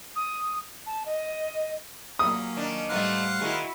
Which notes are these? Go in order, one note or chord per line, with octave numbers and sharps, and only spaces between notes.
D#6
A5
D#5
F#3 A#3 C#4 D#6
D#3 D4
A2 G3 A3 B3 D#4 C5 F5 F#5
D#3 E4 F#4 G#4